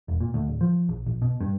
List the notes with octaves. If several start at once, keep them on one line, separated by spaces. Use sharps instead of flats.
E1
A#2
D2
D1
F3
A#1
A#1
B2
G2